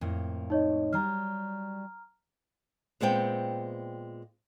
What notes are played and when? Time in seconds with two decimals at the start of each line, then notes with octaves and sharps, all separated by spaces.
0.01 F2 A2 A#3
0.50 D#4 C#5 D#5
0.93 F#3 G3 A#5 F6
3.01 A#2 G#3 B3 C4 G5